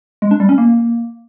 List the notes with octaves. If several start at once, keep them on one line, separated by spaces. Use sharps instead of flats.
G#3
D4
G3
C#4
A#3